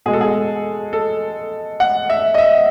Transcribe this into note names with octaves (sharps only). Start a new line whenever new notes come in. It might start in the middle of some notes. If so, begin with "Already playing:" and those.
B2 G#3 G#4
A4
G#4
A4
F#5
E5
D#5
E5